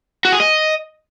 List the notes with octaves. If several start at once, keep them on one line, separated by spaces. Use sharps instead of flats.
F#4
G#4
D#5